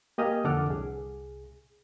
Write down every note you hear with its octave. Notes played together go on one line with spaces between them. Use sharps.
A#3 G4 D#5 G#5 D#6 F6
F2 D3 A4 F#5 D6 F6
C2 G#4